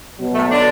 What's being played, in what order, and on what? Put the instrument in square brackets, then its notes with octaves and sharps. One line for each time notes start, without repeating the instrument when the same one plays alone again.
[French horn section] B2 F#3 B3
[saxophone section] A2 A3
D3 D4